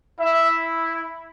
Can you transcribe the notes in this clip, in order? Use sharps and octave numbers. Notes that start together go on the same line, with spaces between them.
E4 E5